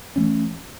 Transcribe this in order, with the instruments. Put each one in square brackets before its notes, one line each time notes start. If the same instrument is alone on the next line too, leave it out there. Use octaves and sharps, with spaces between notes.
[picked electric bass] E3 A3 C#4